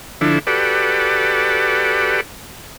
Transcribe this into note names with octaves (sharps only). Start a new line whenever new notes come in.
D3 F3 D4 E4 A4
F#4 G4 A4 B4 D5